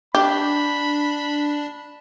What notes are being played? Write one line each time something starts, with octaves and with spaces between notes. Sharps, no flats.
D4 G4 B5